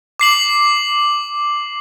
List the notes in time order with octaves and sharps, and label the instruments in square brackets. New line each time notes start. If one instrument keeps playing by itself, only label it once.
[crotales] D6 C7 F#7